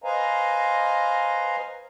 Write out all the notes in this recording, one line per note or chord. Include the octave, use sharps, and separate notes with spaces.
B4 C5 D#5 F5 G#5 A#5